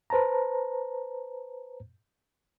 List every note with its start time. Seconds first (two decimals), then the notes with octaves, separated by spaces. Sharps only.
0.10 B4 C5 A5 A#5